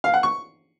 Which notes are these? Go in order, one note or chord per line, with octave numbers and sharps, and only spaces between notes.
F5
F#5
C#6